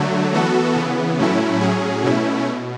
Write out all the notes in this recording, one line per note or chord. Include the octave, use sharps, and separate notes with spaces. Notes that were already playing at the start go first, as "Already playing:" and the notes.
Already playing: D3 F#3 A3
E3 B3 F#4 A4
C#3 E3 B3
A2 F#3 A3 C#4 E4
A2 F#3 C#4 G#4
B2 A3 C#4 E4
B2